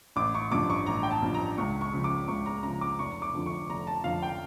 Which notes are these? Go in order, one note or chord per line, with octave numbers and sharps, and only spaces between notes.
A1 D6
C#6
G2 F3 D6
C#6
A1 A#5
G5
A5
G2 F3
A#5
C#2 C#6
C#6
C#3 F3
D6
C#2 C#6
A#5
C#3 F3 A#5
D6
F1 C#6
D6
F2 D3 F3
C#6
F1 A#5
A5
F2 D3 F3 F5
G5